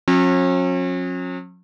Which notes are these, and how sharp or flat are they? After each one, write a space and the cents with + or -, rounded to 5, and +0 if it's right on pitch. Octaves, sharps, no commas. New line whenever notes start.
F#3 -45 C#4 -40